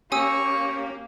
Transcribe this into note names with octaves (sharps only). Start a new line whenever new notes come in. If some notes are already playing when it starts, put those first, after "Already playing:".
A#3 C#4 G4 G#5 C#6 D#6 E6